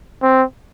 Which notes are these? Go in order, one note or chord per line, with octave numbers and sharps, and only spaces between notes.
C4